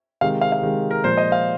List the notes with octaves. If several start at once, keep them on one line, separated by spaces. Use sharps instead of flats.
C3 D#3 G#3 F5
F5
F5
C3 D#3 G#3
A#4
A#2 F3 G#3 C5
D#5
F5